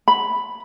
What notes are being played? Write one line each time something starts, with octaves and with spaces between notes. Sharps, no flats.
B5